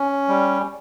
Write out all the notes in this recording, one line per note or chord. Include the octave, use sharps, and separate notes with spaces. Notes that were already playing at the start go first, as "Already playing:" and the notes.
Already playing: C#4
G3